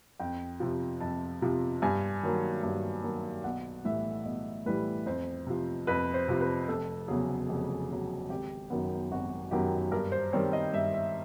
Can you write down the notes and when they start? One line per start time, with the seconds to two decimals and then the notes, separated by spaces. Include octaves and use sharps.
0.20 F2 G5
0.60 C3 F3
1.01 F2 A5
1.42 C3 F3
1.82 G2 G#5
2.23 D#3 F#3 A#3
2.63 G2
3.04 D#3 F#3 A#3
3.44 B1 F#5
3.84 A2 E3 G3 E5
4.25 B1 D#5
4.66 A2 E3 G3 B4
5.06 F2 C5
5.47 C3 F3
5.87 F2 B4
6.14 C5
6.28 C3 F3
6.41 B4
6.68 F1 A4
7.08 E2 C#3 F#3 G#4
7.49 F1
7.89 E2 C#3 F#3
8.30 G#1 G4
8.70 F#2 D#3 F#3 B3
9.12 G#1 F#4
9.51 F#2 D#3 F#3 B3 G4
9.92 G2 A#4
10.12 C5
10.33 D#3 G3 C4 C#5
10.53 D#5
10.73 G2 E5
10.94 E5